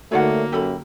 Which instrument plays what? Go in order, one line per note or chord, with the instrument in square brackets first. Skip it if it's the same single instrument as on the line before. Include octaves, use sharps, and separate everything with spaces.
[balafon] D3 D#4 F#4 [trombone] A3 [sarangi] A#3 [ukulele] C#5 D5 F#5
[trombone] F#2 [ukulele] G4 A4 B5